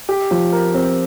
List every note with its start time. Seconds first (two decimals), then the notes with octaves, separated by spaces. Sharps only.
0.09 G4
0.31 F3
0.52 A#4
0.74 C4